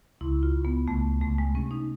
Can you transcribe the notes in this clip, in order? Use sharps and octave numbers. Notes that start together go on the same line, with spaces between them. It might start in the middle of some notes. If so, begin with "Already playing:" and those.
C#2 E4
F4
C#2
B3
C#2 A3
C#2 A3
G#3
C3 C#4
D#4